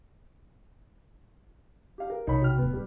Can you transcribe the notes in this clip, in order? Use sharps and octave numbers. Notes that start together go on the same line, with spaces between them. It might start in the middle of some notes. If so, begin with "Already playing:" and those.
G4 F5
A#4
B1 C3 D#4 C#5 B5
F#4 G5 F6
D1 E2 B3
G3 G4